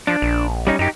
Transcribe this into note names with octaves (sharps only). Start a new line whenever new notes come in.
F3 D4
A#1
G3 C#4 D#4
F#2 D#4 G4